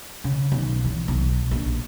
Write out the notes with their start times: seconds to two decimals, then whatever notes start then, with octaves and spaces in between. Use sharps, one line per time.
0.24 C#3
0.52 B1
0.85 E3
1.08 B1
1.51 A#1